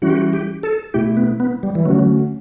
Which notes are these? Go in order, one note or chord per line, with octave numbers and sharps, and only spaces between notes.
E3 G3 C#4 E4 F#4
G4
F#4
G4
A4
B2 A3 E4 G4
B3
B3
G3
E3
D3 F#3 A3 C#4 F#4